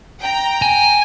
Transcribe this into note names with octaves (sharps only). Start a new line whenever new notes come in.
G5 A#5
G#5